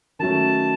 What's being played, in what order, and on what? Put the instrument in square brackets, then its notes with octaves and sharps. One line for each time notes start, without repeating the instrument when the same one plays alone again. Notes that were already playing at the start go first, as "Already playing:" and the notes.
[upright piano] D#3 F#3 A3 C#4 [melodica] A5